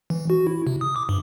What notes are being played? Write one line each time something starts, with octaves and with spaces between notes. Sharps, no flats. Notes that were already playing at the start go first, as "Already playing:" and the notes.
E3
F#4
E4
C3
D#6
D6
G2